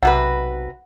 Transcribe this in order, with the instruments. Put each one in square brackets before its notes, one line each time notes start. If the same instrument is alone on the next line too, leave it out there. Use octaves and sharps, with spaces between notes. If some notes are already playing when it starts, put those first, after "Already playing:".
[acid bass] B1 [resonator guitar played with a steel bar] C3 F#4 B4 [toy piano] F#5